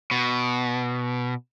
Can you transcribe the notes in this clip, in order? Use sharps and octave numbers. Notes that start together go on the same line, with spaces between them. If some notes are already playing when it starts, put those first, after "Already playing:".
B2